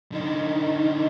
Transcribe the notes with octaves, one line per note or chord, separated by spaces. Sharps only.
D3 D#4